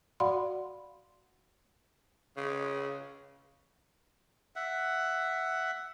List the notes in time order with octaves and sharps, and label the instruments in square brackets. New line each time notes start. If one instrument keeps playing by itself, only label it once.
[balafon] F#4 D5 F5 F#5 B5 C6
[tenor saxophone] C#3
[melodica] E5 F#5